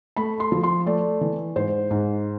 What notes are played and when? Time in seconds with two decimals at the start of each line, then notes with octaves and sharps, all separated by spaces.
0.16 A3 B5
0.40 C6
0.52 F3
0.63 C6
0.86 A3 D5
1.21 E3
1.56 G#2 C5
1.91 G#2